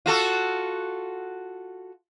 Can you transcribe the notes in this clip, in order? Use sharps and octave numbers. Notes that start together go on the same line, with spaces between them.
F4 F#4 A4